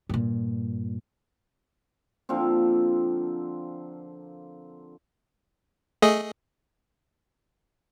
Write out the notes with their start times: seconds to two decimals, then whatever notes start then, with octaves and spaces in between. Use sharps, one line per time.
0.09 G2 A#2
2.29 D3 F3 A#3 C4
6.02 A3 G#4 D#5